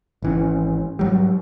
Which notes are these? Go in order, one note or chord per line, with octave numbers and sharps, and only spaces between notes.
G#1 E3 C#4
G#2 F#3 G3